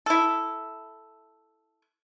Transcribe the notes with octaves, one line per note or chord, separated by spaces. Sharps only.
E4 A4